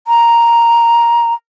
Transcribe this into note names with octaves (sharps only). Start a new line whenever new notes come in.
A#5